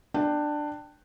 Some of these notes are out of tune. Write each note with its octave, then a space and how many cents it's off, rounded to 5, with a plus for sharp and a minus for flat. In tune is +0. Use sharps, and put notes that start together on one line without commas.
D4 +15 G5 +0